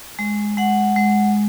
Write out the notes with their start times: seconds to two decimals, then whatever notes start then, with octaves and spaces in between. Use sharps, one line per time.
0.19 G#3
0.57 G#3 F#5
0.96 G#3